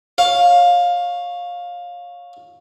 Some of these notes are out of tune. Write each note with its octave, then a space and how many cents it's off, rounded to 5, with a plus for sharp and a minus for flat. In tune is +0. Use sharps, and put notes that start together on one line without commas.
C#5 -5 F5 +15